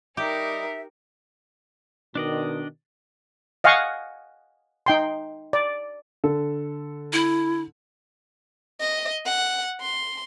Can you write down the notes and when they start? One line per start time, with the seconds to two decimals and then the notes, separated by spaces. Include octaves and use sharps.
0.17 G3 D#4 G4 A#4 D#5 E5 D6
2.15 B2 D#3 D4 D5 D#5
3.64 D#5 F5 F#5 G#5 C#6
4.86 D#4 G5 C6
5.53 D5
6.24 D3 A4
7.13 E4
8.81 D#5
9.25 F#5
9.81 C6